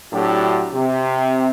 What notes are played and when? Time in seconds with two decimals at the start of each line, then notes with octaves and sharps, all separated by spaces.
0.13 A2 F#3 D4 E4 F#4 G4
0.74 C3